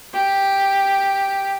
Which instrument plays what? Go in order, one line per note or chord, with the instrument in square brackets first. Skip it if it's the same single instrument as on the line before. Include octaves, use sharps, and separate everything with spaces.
[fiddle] G4